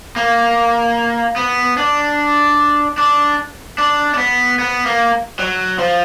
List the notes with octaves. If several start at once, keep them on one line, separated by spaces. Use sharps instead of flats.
A#3
B3
D4
D4
D4
D4
B3
B3
A#3
F#3
F3